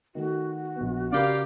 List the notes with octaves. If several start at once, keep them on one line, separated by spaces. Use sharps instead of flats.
D#3 A3 F#4
A#1 B3
C#3 G4 A#4 D5 F5 B5